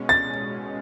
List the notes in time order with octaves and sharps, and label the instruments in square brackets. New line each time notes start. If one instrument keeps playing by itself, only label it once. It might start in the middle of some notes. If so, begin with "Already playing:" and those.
Already playing: [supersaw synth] B2 G#3 C#4
[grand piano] A6